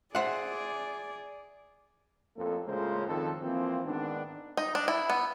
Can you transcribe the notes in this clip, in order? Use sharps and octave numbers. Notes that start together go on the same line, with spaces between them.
G#4 C5 D5 E5 F#5
A1 F2 A#3 A4
A2 C#3 G#3 A#3 F4 C5
G#1 F2 D#3 A4
E3 F3 A#3 C4
G#2 D#3 B3 D4
D#4
D4
E4
B3